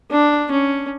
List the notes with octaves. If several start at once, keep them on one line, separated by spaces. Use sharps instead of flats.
D4
C#4